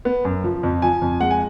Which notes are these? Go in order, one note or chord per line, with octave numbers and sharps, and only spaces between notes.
B3
F#2
F3
F2
F3 G#5
F2
G#3 F#5
G#5